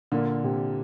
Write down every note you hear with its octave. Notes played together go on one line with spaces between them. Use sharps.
A#2 D3 A#3
C3